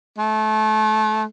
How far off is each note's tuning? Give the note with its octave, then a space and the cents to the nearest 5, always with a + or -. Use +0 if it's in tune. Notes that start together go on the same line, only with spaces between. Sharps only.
A3 -30